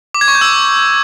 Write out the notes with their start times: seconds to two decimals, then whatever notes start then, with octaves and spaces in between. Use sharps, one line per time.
0.14 D6
0.21 G#6
0.28 C#6
0.35 G6
0.41 E6